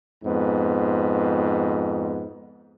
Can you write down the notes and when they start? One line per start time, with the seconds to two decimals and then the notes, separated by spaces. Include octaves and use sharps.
0.24 F2 G#2 B3